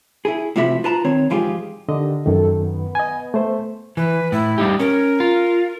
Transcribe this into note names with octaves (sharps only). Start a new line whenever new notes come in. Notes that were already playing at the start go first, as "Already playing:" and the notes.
E4 G#4
A2 C3 F3 F#4 E5
F4 B4 A5 A#5
D#3 C4 C#5
G#2 F3 F4 G4 G#4
D3 D#3 G4 D#5
F#2 D#3 A4
B3
D#5 G#5
A3 C5
E3 B4
A2 E4
G3 D#4 G4
C#4 A#4
F4